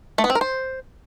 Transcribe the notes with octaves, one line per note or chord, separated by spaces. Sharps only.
A3
B3
C4
A#4
C5